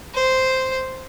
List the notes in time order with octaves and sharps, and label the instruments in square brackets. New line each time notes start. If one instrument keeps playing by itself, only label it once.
[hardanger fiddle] C5